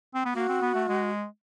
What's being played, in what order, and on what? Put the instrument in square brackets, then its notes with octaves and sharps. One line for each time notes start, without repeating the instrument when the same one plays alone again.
[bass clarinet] C4
B3
[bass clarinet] A#3 [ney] F#4
[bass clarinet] C4
B3
A3
G#3